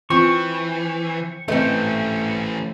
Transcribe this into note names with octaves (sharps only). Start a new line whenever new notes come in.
E3 C4 F4 C#6
E3 A3 C4 C#4 B4 D#5